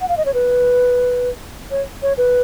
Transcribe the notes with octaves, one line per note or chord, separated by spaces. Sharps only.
F#5
F5
D#5
C#5
B4
C#5
C#5
B4